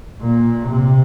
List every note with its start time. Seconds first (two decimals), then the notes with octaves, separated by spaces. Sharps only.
0.21 A#2
0.69 C3